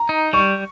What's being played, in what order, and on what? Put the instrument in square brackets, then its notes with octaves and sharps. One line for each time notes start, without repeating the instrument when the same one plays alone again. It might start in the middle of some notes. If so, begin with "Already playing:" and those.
Already playing: [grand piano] A#5
[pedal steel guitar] D#4
[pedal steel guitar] G3 [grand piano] C#6